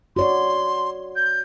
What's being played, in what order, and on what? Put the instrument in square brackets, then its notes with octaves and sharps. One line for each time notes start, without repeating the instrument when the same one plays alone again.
[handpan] F#4 C#5 D5 [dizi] C6
[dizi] G6